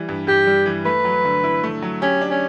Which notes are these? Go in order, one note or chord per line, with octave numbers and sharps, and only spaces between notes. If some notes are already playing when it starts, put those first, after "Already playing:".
Already playing: E3 G3
G2
G2 G4
G3
E3
A3 B4
F#3
D3
E4
A3
F#3
C#4 G4
D4
C#4